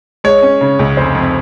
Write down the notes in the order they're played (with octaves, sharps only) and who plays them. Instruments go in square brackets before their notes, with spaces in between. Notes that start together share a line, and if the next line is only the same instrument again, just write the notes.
[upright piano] G#3 [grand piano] C#5
[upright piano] C#4
C#3
C#2
[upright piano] F1 [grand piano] C5
[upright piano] F2